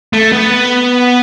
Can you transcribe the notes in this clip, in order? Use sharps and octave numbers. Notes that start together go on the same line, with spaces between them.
A3
B3